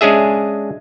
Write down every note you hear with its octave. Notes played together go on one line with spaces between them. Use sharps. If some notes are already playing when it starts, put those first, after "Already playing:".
G#3 C#4 D4 G#4 E5